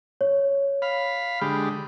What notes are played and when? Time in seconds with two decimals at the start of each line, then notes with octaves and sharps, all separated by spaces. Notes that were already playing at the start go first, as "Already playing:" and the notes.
0.21 C#5
0.82 F5 B5
1.41 D3 G#3 G4 B5